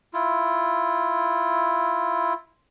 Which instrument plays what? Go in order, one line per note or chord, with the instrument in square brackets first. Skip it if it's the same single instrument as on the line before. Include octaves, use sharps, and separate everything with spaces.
[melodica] E4 F4